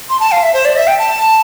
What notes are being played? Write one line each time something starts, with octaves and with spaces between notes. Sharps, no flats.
C6
A5
F5
E5
C5
D5
E5
G5
A5